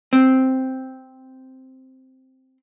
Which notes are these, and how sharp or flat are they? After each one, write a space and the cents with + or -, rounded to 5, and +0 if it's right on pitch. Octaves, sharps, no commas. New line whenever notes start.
C4 +0